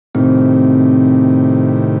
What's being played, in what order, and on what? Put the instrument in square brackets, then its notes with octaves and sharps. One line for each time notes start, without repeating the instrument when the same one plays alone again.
[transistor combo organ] A2 C3 D#3 [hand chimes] C4